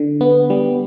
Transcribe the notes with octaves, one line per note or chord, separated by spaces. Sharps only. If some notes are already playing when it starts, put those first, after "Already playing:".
Already playing: D3
B3
G3